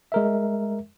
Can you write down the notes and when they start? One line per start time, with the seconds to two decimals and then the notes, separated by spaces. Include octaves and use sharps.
0.12 G#3 A#4 E5